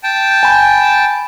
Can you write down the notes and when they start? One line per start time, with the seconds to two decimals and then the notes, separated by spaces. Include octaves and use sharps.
0.03 G5 A5
0.43 G#5 B5